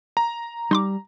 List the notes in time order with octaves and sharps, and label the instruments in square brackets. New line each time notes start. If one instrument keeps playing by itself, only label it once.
[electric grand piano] A#5
[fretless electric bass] G3 [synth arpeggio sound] D#4 C6 D6